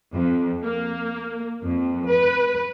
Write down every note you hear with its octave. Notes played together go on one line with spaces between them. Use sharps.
F2
A#3
F2
B4